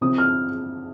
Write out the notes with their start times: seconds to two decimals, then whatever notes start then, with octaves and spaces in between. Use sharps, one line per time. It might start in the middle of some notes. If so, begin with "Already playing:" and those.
0.01 C3 F3 C4 D#6
0.18 F6